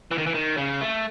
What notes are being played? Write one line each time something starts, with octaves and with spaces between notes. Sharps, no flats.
E3
D#3
E3
D#3
C#3
A3